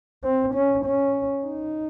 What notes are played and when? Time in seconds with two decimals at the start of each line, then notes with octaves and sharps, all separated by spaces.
0.24 C4
0.54 C#4
0.85 C#4
1.45 D#4